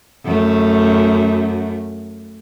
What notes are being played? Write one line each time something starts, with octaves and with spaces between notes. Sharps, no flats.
F#2 A3